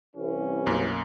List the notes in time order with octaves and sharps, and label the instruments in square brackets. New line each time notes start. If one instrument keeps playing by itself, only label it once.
[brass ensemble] C2 E3 C#4
[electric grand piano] B1 F#2 A#3